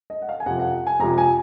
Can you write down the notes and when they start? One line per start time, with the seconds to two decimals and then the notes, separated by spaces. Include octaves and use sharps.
0.10 D#5
0.22 F#5
0.29 F5
0.40 G#5
0.46 F2 C3 F3 F#5
0.60 F#5
0.87 G#5
0.99 F2 C3 F3 A#5
1.18 G#5